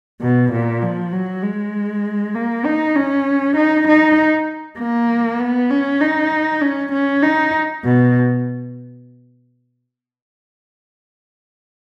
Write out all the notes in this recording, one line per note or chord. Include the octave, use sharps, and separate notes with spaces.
B2
A#2
F3
F#3
G#3
A#3
D#4
C#4
D#4
D#4
A#3
B3
C#4
D#4
C#4
C#4
D#4
B2